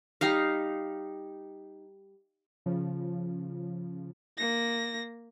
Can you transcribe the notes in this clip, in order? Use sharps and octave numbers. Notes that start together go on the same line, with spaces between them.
G3 D#4 F5
C#3 F3
A#3 A#6